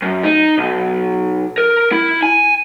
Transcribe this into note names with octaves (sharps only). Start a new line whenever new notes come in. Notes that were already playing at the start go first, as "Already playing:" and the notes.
F#2
D#4
B1
A#4
E4
G#5